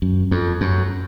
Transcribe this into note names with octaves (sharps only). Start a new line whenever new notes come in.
F#2
F2
F#2